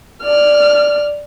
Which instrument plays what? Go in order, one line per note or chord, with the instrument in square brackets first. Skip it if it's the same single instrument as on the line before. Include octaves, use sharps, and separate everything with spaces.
[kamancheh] D5 F6